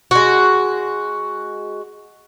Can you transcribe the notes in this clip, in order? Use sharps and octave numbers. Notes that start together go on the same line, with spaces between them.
G#3 F#4